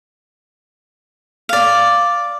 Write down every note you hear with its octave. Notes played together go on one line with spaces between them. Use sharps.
D5 F5